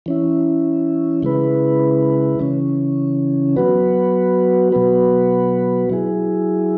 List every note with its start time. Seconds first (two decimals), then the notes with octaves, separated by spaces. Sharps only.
0.06 E3 C#4 E4
1.23 C#3 G#3 E4 B4
2.39 C#3 E3 C#4
3.56 F#3 B3 F#4 B4
4.72 B2 F#3 B3 F#4 B4
5.90 F#3 E4 G#4